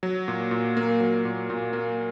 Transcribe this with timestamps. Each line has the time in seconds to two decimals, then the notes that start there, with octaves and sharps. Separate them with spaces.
0.03 F#3
0.28 A#2
0.51 A#2
0.77 A#3
1.00 F#3
1.25 A#2
1.50 A#2
1.73 A#3